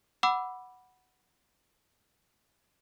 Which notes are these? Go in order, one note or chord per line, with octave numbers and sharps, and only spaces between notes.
F#5 B5 D6 E6